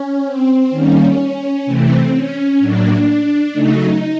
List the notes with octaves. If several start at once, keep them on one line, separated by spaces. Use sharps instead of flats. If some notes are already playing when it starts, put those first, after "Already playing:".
Already playing: C#4
C4
D#3 G3 A#3 C#4
C3 E3 A3 C4
C#4
A2 F#3 A#3 D4
C#3 F#3 A3 D#4